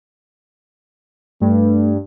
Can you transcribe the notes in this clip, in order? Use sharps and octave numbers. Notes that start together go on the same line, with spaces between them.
G2 A3